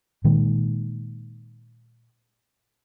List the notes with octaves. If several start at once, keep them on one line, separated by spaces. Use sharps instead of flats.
A#2 D#3 G#3